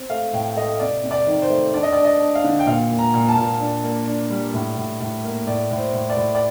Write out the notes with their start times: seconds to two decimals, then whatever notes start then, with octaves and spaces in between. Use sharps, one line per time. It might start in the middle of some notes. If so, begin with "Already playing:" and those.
Already playing: C4
0.10 A3 F5
0.33 A2 G5
0.57 A3 D#5
0.80 C3 D5
1.03 C3
1.11 D5
1.27 D#3
1.42 C5
1.50 A3
1.74 D4 D5
1.83 D#5
1.92 D5
1.97 D4
2.04 D#5
2.20 D4
2.35 F5
2.44 D3
2.59 G5
2.66 A#2 F5
2.90 A#2
2.99 A#5
3.14 A#2
3.28 A5
3.37 A#2
3.60 D4
3.84 A#3
4.07 D4
4.30 G3
4.54 A2
4.77 A2
5.00 A2
5.24 A#3
5.47 A2 D5
5.71 A2
5.77 C5
5.93 A2
6.10 D5
6.17 A2
6.35 D5